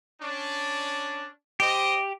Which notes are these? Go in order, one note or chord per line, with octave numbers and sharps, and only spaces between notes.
C#4 D4
G4 C5 D#5